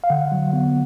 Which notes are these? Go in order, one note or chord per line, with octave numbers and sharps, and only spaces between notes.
F5
D3 F#5
F#3
B3